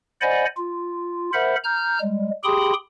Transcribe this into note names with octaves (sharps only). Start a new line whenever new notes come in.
C5 D5 D#5 F#5 G#5 B5
F4
A#4 C5 E5 F#5 B5
A#5 F6 G6
G3 G#3
G4 G#4 G5 B5 C6 D#6